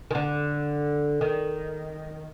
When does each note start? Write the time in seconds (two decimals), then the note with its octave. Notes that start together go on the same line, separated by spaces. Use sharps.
0.11 D#3
0.15 D3
1.21 D#3